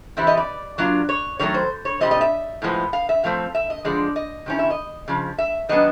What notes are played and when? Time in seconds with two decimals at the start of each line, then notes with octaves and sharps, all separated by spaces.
0.17 E3 G3 C4 E4 E5
0.27 D#5
0.37 D5
0.78 F#3 A#3 D4 F4
1.09 C#5
1.39 D#3 F#3 A3 C#5
1.54 C5
1.85 C#5
2.01 A#2 G3 C4 D#5
2.11 D#5
2.21 E5
2.62 A2 F3 G#3 B3
2.93 F5
3.09 E5
3.24 F3 A3 C4 F5
3.55 E5
3.70 D#5
3.85 D3 F3 G#3 D5
4.16 D#5
4.46 C3 D#3 C#4 E4
4.59 E5
4.70 D#5
5.08 C#3 F3
5.38 E5
5.69 D#3 F#3 B3 D4 D#5